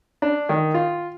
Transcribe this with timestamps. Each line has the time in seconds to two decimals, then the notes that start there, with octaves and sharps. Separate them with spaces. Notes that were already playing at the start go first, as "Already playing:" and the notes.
0.22 D4
0.49 D#3
0.74 F4